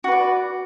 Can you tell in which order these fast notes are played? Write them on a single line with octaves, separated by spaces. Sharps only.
F#4 B4 D5